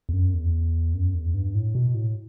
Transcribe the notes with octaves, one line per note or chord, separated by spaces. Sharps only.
E2
F#2
E2
F#2
E2
G2
A2
B2
A2